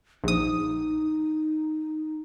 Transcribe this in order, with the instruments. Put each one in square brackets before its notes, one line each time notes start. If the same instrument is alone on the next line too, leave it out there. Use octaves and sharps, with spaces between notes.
[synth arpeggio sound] A#1 D#6 [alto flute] D#4